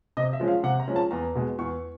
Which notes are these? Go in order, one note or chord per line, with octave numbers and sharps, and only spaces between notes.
C3 D#5
E5
F3 G#3 C#4
F5
C3 F#5
A#5
F3 G#3 C#4
A5
E2 A#5
B2 G#3
E2 C#6